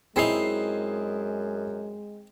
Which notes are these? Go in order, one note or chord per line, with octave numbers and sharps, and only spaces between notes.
F#2 G#3 C4 D#4 E4 G#4 C7